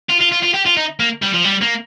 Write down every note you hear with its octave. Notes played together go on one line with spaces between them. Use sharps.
F4
F4
F4
F4
G4
F4
D#4
A#3
G3
F3
G3
A#3